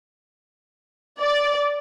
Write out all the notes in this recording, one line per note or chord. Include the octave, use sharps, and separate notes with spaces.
D5